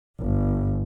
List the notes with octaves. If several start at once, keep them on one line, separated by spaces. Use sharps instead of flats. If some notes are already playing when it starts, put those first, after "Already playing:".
G1